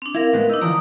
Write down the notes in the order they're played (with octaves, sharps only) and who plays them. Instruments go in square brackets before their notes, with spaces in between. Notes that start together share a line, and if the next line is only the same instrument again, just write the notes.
[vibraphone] C4 D4
[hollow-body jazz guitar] E4 [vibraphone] A#4 F5
[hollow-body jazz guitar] A2 G#3 B3
[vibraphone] D4 E6 [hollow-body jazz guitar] D#4
[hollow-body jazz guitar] D3 E3 F3 [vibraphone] D5 A#5 D#6